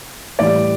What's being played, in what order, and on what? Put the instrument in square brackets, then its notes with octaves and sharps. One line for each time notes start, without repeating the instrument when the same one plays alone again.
[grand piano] A2 E3 G3 D5